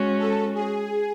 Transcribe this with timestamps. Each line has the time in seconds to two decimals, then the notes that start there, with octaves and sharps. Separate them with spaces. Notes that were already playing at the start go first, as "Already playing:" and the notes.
Already playing: G#3 C#4 F#4
0.19 A4
0.55 G#4